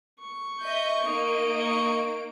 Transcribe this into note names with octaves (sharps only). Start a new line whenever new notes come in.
C#6
D#5 E5 G6
A#3 D#4 D#5 D7
C#6